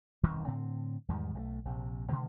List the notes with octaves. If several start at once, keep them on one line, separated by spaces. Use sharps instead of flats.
E1 C2 F#2 D#3
A2 D3 C4
E2 G#2 D#3 G3
B1 F#3 A3
A#1 C3
B2 D3 D#3 G#3